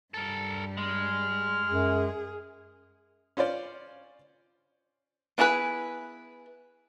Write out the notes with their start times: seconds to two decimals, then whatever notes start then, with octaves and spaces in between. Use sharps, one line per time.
0.14 G2 G3 A4 A#4
0.77 G#3 F6
1.66 F#2 G#4
3.37 C#4 F4 C5 D5
5.38 B3 E4 G#4 A#4 B4